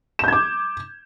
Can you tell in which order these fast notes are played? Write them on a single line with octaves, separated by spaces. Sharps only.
E7 G6 G#6 D6